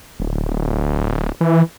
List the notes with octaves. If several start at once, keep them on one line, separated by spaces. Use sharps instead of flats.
D1
E3